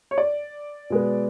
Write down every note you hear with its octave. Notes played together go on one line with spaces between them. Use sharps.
C#5
D5
B2 G#3 B3